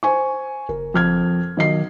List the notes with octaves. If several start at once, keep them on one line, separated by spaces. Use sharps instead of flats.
C5 G#5 C#6
F#1 A#4
F2 F6 G#6
B1 D#3 D#5 C7